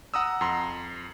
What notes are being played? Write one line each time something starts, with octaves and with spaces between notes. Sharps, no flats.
F#5 A#5 D#6 E6
F2 A#5 C6